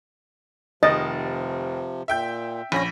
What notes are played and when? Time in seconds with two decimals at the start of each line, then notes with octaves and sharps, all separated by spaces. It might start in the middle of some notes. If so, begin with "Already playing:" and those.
0.83 F1 C3 D#3 F3 D#5 A6
2.08 A#2 E5 G5 G6
2.72 A#1 C#4 B5 A#6